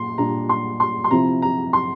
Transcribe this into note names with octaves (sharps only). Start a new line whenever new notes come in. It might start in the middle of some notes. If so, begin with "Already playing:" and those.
Already playing: A#2 C6
A#2 G3 D4 A#5
C6
C6
C6
C3 F3 C4 E4 A#5
A#5
C6